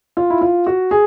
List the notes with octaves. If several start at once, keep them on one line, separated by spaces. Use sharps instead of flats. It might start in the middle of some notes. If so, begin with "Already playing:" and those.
F4
E4
F4
F#4
G#4